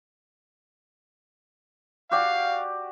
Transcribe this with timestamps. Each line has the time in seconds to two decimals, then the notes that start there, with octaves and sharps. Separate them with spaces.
2.11 F#4 G4 D5 F5